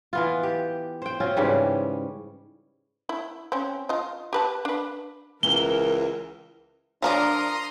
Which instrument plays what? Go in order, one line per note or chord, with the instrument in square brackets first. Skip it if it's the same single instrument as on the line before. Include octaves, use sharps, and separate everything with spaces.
[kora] E3 B3 F4
G4
C5 G5
C4 C#4 F4 F#4
G#2 C#3 E3 G3
[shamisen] E4
C4 C#4
F4 D#5
G4 B4 A5
D4 B4
[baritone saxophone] C#2 [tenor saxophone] E3 [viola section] A#4 [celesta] G7
[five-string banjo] F3 A#4 D5 [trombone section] D4 [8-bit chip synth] A#5 C6 D#6